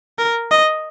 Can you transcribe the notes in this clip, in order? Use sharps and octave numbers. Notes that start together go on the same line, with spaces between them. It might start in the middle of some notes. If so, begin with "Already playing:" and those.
A#4
D#5